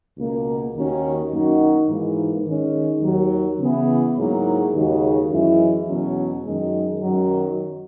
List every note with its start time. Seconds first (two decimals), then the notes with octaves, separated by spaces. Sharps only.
0.17 C#2 B2 A#3
0.75 D#2 D#3 A#3 C#4 F#4
1.32 F#2 D#3 A#3 D#4 F#4
1.88 G#2 E3 A#3
2.46 D#3 G#3 C#4
3.02 D#2 D#3 F#3
3.59 C#3 E3 B3 E4 G#4
4.17 G#2 F#3 A#3 E4 G#4
4.73 D#2 C#3 G#3 D#4 F#4
5.31 F#2 E3 G#3 C#4 E4
5.87 E2 B2 F#3 C#4
6.44 F#2 D#3 G#3
7.00 F#2 D#3 F#3